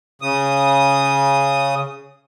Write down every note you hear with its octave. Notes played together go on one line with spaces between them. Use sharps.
C#3 D#6